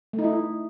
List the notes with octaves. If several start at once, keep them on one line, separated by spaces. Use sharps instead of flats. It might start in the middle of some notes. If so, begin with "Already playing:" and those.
A3
D#4
E4